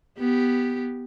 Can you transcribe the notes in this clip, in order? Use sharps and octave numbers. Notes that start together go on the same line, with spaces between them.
B3 G4